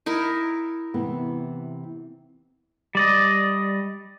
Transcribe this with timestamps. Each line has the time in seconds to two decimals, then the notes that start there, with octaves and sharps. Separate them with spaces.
0.06 D#4 E4 A#4
0.94 C3 E3 B3
2.95 G3 D5 D#5